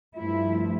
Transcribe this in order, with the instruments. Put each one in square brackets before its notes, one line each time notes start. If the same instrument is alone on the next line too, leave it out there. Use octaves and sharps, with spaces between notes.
[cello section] G2 F3 A3 E4